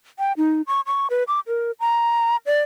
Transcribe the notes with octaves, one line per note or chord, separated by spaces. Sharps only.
G5
D#4
C#6
C#6
B4
D6
A#4
A#5
D5